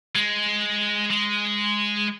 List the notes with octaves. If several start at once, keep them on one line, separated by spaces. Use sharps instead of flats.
G#3
G#3